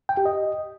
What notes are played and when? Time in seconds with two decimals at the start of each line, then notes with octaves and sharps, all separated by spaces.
0.09 G5
0.17 G4
0.26 D#5